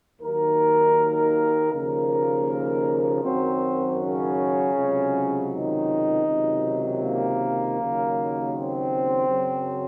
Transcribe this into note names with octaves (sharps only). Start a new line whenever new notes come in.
D#2 D#3 F#3 A#3 A#4
D#2 C#3 F3 A#3 A#4
F#2 D#3 F#3 C4 C5
C#3 C#4
C#2 C3 F#3
D#3 D#4
C#2 C3 D#3 F#3
A#3 A#4
D#2 C#3 F#3
C4 C5
F#2 C#3 F#3